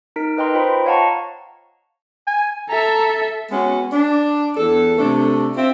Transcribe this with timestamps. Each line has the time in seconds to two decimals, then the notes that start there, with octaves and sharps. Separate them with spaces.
0.16 D#4 A#4 B6 D7
0.38 B4 D#5 G5 A#5 C6
0.55 F4 C5 D#5 G5 B5
0.86 C#5 F5 F#5 A5 A#5 C#6
2.27 G#5
2.69 A4 E5 A#5
3.51 G#3 B3 C#4 F#4
3.92 D4
4.57 E2 A4
4.99 C3 A3 D4
5.57 C4 F4 E5